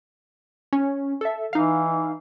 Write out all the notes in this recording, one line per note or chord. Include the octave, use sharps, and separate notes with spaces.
C#4
A4 E5
E3 D#4 F5